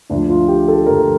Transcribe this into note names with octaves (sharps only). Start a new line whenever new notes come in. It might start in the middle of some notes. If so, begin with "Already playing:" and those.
D2 D3 F3 D4
F4
G4
A4
D2 D3 F3 A#4